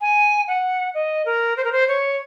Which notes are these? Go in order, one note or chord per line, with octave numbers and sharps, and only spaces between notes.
G#5
F#5
D#5
A#4
C5
A#4
C5
C#5